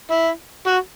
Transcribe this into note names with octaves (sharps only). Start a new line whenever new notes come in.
E4
F#4